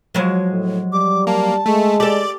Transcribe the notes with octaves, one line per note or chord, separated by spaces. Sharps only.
F3 F#3 G#3
A2
G3 D6
A#3 A5
G#3 A3
G4 A4 D5